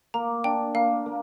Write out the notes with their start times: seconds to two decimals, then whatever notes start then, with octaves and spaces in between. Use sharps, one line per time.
0.14 A#3 A#5
0.44 D4 G5
0.75 A#3 F5
1.06 A#3